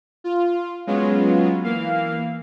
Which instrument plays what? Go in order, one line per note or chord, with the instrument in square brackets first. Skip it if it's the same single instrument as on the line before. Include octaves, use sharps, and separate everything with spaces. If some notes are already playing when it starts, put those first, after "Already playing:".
[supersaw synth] F4
F#3 G#3 B3 C#4 F4
E3 A#3 F5